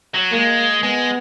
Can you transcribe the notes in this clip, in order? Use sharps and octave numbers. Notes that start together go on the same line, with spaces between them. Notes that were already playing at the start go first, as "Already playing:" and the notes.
F#3
G#3 A#3
G#3 B3